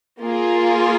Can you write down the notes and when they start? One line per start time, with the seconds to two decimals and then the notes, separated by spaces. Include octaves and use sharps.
0.21 A#3 F4 G#4